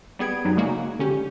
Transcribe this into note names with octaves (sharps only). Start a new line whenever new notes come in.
G3 B3 G#4 G#6 D7
F#2 F#3 G3 D#4
C#3 G#3 A#3 F#4
D3 C#4 G4